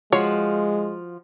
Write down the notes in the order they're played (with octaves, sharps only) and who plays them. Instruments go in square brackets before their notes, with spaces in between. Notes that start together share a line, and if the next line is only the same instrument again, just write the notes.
[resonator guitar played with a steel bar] F3 F4 F#4 [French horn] G#3 [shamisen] C#5